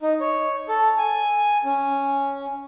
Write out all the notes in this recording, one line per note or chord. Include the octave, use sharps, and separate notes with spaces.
D#4
C#5
A4
G#5
C#4